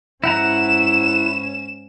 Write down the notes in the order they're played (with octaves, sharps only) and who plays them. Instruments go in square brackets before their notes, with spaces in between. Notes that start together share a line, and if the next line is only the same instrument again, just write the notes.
[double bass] G#2 C#4 [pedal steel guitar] E4 F#5 A#5 [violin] E7